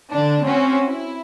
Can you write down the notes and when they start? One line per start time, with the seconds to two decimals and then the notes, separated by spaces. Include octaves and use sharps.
0.13 D3 D4
0.46 C4 C#4 F#4
0.86 E4